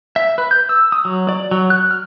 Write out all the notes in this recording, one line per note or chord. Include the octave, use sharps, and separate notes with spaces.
E5
B4
G6
E6
D#6
F#3
D5
F#3
F#6
F6